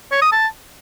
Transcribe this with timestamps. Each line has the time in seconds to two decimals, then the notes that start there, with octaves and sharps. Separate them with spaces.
0.11 C#5
0.22 D#6
0.32 A5